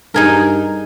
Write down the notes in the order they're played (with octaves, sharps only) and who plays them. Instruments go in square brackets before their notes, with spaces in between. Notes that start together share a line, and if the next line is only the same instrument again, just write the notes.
[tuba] G2 [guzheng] D#4 G#4 A#4